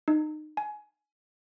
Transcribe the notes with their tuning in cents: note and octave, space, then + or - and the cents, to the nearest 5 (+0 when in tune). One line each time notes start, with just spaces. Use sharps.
D#4 -25
G#5 +20